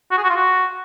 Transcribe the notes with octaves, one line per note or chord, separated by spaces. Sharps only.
F#4
G#4
F#4
F4
F#4